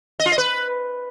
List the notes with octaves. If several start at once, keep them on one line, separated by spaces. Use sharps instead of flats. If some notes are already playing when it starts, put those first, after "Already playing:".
D#5
F4
D#5
B4